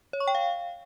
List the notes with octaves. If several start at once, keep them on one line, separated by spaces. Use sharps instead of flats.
C#5
C#6
G5
F5